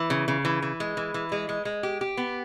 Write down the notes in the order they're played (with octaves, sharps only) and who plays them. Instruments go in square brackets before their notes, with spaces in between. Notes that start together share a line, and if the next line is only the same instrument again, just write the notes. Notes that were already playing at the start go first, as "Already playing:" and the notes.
Already playing: [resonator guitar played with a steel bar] E3
C#3
C#3
E3
E3
G#3
E3
E3
G#3
G#3
G#3
G4
G4
B3